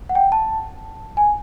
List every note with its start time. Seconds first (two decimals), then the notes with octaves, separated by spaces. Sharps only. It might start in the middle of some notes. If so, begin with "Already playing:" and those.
0.09 F#5
0.15 G5
0.32 A5
1.17 G#5